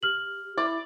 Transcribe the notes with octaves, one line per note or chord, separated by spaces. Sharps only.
G4 F6 F#7
E4 D5